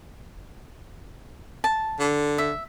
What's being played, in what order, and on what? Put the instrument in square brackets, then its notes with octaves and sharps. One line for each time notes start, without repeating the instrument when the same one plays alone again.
[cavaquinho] A5
[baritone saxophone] D3
[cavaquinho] E5